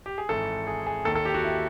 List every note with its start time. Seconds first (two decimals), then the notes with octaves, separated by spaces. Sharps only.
0.06 G4
0.18 G#4
0.29 G#1 G#2 E3 A4
0.67 G#4
0.87 G#4
1.05 D#2 D#3 A4
1.15 A4
1.25 G4
1.34 F#4
1.44 E4